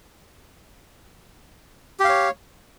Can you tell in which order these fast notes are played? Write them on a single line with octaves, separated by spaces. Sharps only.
G4 F5 C#5